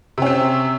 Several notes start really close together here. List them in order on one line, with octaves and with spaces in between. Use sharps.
C3 C#4 C4